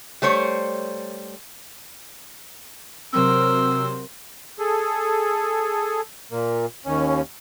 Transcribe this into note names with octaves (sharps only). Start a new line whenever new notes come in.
G3 A3 C5 C#5
C3 F#3 C4 A#4 C5 E6
G#4 A4
A#2 A#3
D#2 C#4